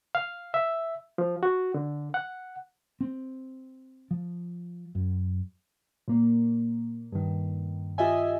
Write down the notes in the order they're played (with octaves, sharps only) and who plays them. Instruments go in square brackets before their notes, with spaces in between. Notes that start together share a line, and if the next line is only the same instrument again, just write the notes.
[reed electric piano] F5
E5
F3
F#4
D3
F#5
[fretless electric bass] C4
F3
F#2
[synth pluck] A#2 A#3
G2 D#3
F4 G4 D#5 E5 G#5